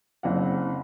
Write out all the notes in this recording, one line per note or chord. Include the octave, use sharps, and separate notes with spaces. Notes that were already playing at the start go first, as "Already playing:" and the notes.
F#1 C4 F#5